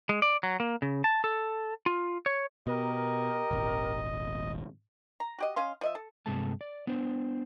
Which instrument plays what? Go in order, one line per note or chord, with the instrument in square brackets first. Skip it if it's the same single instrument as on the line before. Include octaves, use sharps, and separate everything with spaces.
[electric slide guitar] G#3
D5
F#3
A#3
C#3
A5
A4
F4
C#5
[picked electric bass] B2 [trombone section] G4 A#4 [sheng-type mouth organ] D#5
[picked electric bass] D#1 G#1
[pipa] A#5
F#4 G4 D#5
C#4 D#5 F5 C6
F3 D#5 E5
A4
[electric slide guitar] G2 C3 G#3 A3 A5
D5
B3 D4 C5